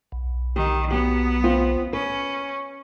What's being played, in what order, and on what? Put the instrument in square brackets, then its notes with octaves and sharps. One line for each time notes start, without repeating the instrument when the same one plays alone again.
[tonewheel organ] B1
[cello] D#3 [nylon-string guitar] G4
[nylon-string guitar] F#3 G4 [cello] B3
[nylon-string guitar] C4 F4
[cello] C#4 [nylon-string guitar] B4